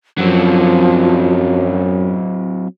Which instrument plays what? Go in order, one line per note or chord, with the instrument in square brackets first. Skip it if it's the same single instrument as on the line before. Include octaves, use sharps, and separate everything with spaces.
[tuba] F#2 [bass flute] F3 [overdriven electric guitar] F#3 C4